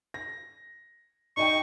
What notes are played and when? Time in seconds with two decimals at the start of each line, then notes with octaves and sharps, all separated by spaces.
0.14 A#6
1.37 D#4 D#5 G5 C#6